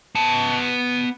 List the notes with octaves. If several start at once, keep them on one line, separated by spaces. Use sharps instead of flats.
B3 A5